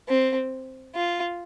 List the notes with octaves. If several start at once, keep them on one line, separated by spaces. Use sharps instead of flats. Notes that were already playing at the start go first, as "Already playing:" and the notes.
C4
F4